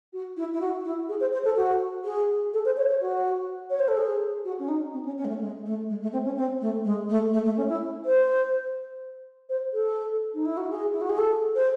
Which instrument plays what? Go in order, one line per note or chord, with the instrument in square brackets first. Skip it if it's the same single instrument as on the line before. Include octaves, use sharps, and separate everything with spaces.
[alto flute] F#4
E4
E4
F#4
E4
G#4
C5
C5
A4
F#4
G#4
A4
C5
C#5
C#5
F#4
C#5
C5
A4
G#4
F#4
C#4
D#4
C4
C#4
C#4
G#3
A3
G#3
A3
G#3
A3
C4
C#4
C4
A3
G#3
A3
A3
A3
C#4
E4
C5
C5
A4
D#4
E4
F#4
G#4
E4
F#4
G#4
A4
C5